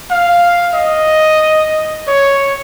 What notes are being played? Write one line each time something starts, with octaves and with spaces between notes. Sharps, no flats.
F5
D#5
C#5